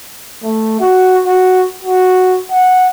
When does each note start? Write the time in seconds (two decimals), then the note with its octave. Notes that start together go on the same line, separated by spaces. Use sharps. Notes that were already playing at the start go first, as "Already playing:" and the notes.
0.43 A3
0.80 F#4
1.25 F#4
1.83 F#4
2.51 F#5